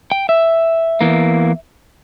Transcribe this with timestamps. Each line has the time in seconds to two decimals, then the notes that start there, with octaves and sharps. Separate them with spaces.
0.12 G5
0.29 E5
1.01 E2 E3 A#3